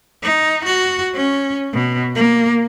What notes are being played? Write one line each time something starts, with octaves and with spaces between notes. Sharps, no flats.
D#4
F#4
C#4
B2
A#3